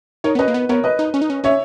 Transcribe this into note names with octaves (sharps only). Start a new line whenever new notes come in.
D#4 A#4 C#5
B3
C#4 B4 D#5
A#3
B3
B3 A#4 C#5
B4 D#5
D#4
C#4
D#4
C#4
C#4 C#5 E5